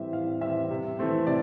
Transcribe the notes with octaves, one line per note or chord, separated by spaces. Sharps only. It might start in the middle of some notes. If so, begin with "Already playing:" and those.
Already playing: A2 E3 G3 C4 E5
A2 F5
E3 G3 C4 E5
C3
E3 A3 C4
C3 D5